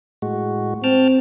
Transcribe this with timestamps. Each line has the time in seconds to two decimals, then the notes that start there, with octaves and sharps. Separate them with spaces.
0.22 A2 G#3 F#4
0.84 C4 G5 A5 F6